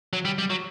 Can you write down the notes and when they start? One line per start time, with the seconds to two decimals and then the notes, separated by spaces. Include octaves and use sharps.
0.13 F#3
0.25 G3
0.38 G3
0.50 F#3